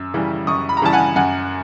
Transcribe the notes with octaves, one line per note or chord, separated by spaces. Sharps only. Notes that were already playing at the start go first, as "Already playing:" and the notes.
Already playing: F#2 E6
C#3 E3 G3
F#2 C#6 D#6
B5
A#5
C#3 E3 G3 A5
F#5 G#5
F#2 F#5 G#5